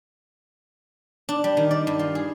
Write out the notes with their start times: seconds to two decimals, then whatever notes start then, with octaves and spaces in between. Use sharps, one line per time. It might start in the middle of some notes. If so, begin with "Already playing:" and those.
1.29 D4
1.44 G3
1.57 D#3
1.71 D5
1.87 G2
1.99 F4
2.15 G#4